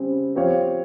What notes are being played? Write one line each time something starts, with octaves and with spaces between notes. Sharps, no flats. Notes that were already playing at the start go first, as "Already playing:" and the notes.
Already playing: C#3 G3 C4
F3 C4 G4 C#5 F5